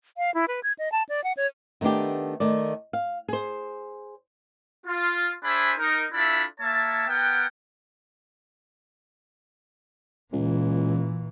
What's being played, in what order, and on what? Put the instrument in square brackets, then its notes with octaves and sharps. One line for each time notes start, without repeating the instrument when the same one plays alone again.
[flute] F5
E4
B4
G#6
D#5
A5
D5
F#5
C#5
[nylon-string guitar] D#3 A3 B3 D4 G4
D#3 A3 D5
F5
G#4 C5
[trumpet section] F4
D4 G#4 C5 E5 G#5 B5
D#4 A#4
D4 E4 F4 A4 E5 B5
A#3 C#5 E5 A5
B3 A#4 F#5 G5
[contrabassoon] C#2 [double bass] A#2 E3